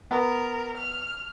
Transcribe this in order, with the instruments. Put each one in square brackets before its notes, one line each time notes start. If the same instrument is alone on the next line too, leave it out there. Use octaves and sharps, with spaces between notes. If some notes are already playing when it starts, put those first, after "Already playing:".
[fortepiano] B3 [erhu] A#4
[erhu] F6